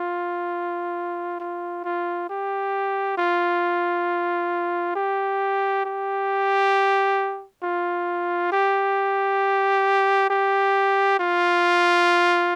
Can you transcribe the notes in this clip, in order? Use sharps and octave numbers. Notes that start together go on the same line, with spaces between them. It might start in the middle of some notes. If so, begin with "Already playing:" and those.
Already playing: F4
F4
F4
G4
F4
G4
G4
F4
G4
G4
F4